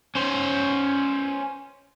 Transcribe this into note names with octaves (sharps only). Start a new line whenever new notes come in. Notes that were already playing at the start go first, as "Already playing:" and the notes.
C#4 C5